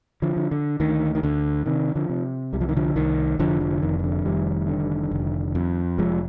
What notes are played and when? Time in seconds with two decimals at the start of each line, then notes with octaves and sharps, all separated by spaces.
0.22 D3 F3
0.37 D3
0.51 D3
0.80 D2 D#3
1.15 D#3
1.23 D2 D3
1.66 C3 D#3
1.96 D3 F3
2.10 C3
2.53 C2 G3
2.61 F3
2.69 D#3
2.77 D3 F3
2.96 C2 D#3
3.39 F1 D3 F3
3.60 D3 F3
3.82 F2 D#3
3.99 D#3
4.04 D3
4.25 F1 D#3 G3
4.68 D3
5.11 F1
5.55 F2
5.98 F1 F3 G#3